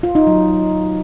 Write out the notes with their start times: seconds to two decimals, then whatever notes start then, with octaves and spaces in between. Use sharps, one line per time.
0.03 F4
0.15 D#4
0.27 F#3